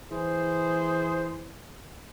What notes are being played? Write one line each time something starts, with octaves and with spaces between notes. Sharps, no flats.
E3 G#4 C5